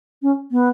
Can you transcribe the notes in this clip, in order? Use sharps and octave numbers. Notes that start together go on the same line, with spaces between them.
C#4
B3